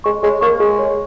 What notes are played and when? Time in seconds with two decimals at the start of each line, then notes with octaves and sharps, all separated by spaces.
0.04 G#3 C#6
0.23 G#3 C#5
0.41 A#3 C#6
0.59 G#3 G#4
0.79 C#5